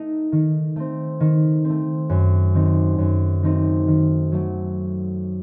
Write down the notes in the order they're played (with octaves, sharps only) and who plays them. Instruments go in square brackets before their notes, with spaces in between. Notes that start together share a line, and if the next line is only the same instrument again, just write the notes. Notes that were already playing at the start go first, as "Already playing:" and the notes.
Already playing: [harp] A3 D#4
D#3
A3 C4
D#3
A3 C4
F#2
D#3 A3 C4 D#4
F#2
D#3 A3 C4 D#4
D#3
F#3 A3